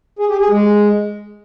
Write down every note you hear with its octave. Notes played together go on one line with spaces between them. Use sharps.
G#4
G4
G#4
G#3